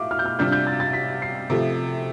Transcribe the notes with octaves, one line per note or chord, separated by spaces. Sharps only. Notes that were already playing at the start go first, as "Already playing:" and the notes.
Already playing: A2 F4 E5 D6
F6
G6
F6
C3 G3 D4 F4 G6
G6
A6
A6
B6
C7
C3 F3 A3